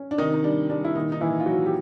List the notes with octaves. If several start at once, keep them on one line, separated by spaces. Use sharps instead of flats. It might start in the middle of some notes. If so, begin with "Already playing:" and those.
Already playing: C#4
D4
C3 D#3 D#4
D#4
G3 D4
G3 D4
E4
A#2 D#3 D#4
D#4
A#2 E3 E4
F4
F#3 F#4
G4